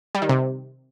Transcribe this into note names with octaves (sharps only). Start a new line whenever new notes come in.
G3
D#3
C3